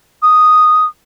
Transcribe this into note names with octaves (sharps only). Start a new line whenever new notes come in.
D#6